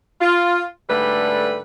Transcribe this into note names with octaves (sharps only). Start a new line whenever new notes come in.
F4
G#2 D3 G3 A3 B4